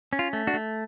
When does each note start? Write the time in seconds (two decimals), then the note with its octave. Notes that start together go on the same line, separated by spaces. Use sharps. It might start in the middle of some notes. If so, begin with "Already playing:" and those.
0.13 C#4
0.19 F4
0.33 A3
0.47 D4 F#4
0.54 A3